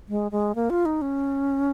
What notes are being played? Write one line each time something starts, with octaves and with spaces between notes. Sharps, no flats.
G#3
G#3
A#3
F4
D#4
C#4